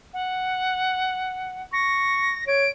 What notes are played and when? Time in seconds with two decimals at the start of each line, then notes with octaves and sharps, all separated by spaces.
0.13 F#5
1.73 C#6 A#6
2.47 C#5 D7